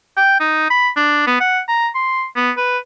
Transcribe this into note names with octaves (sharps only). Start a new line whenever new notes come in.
G5
D#4
B5
D4
B3
F#5
A#5
C6
B3
B4